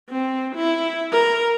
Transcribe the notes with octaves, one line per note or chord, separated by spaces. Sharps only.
C4
E4
A#4